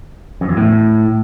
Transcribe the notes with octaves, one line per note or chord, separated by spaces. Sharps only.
F#2
E2
A2